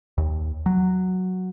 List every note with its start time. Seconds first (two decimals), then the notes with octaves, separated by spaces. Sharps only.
0.18 D#2
0.66 F#3